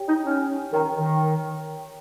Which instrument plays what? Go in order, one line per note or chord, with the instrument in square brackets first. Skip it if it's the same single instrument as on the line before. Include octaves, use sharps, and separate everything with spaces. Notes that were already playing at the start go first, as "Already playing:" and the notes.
Already playing: [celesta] G4 C#5 G5
[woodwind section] D#4
C#4
[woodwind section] D#3 [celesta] A#4 C#5 G5 A#5
[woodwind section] D#3